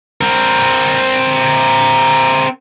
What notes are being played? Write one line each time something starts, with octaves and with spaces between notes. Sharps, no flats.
C4 A#4